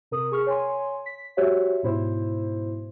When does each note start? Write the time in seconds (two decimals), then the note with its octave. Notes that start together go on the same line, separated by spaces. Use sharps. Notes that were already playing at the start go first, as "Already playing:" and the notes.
0.11 C3 A#4 D#6
0.32 G#4 C#6 F6
0.46 C#5 G#5 C6
1.06 B6
1.37 F#4 G4 C5 C#5 E5
1.83 G#2 B2 E4 C5